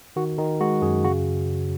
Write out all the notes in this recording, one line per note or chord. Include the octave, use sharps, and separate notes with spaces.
D#3 F#4
D#3 D#4
G#3 F#4
F#2 G#4
C#3 F#4